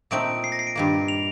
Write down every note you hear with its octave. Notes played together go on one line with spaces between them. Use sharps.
A#2 A3 C4 D#4 D7
C7
A#6
C7
D7
G2 D#3 A#3
F7